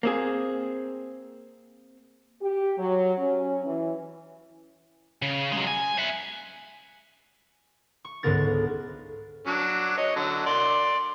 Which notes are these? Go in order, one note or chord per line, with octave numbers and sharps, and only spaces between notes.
A#3 C4 G#4
G4
F#3
C#4
E3
C#3
F#3 G#3
G#5
E5 F#5
C#6
C#2 G#2 D3 B3 A#4 A6
F#3 D4
C#5 D#5
D3 F#3
D5 C6